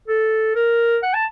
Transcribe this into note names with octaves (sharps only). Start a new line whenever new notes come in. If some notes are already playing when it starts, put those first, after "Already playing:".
A4
A#4
F#5
A5